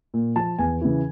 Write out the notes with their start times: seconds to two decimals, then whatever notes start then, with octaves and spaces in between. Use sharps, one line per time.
0.14 A#2
0.36 F3 A5
0.59 E2 G#5
0.81 C#3 E3